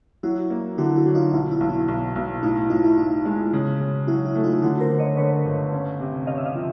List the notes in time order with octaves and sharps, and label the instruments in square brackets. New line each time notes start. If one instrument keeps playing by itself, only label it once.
[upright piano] F#3 [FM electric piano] E4 F#4
[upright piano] A#3
[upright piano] D3 [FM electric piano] E4 F#4
[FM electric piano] E4
[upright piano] F#3
[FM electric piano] D#4 F4
[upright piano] B1 [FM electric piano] E4
[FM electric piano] E4
[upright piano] B1
[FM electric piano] E4
[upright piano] B1
B1
[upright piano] A2 [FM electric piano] D#4 F4
[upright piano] A2 [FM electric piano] D#4 F4
[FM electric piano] E4
[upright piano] A2 [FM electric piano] D#4
[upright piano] G#3
C#3
C#3
[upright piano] F#3 [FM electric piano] E4
[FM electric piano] E4
[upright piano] A3
[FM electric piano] D#4 F4
[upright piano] D3 [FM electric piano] E4 F#4
[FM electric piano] A#4 C5
[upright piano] D3
[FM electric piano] C#5 D#5
[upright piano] D3 [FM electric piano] B4 C#5
[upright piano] G1
C#4
C3
[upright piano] C#4 [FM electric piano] D#5 F5
[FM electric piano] E5
D#5 F5
[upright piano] F3